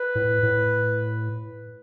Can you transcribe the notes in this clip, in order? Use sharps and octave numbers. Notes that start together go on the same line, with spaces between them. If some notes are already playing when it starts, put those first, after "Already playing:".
Already playing: B4
A2
A2